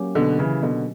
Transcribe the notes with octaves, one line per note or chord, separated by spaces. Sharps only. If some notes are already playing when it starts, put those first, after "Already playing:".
Already playing: F#3 A#3 C#4 G4
B2 D3
C#3 E3
B2 D3